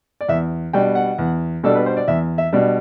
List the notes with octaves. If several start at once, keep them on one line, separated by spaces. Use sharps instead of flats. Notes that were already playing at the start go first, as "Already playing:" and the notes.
D5
E2 E5
B2 G3 D4 G5
F#5
E2
B2 G3 D4 A4
B4
C5
D5
E2 E5
E5
B2 G3 D4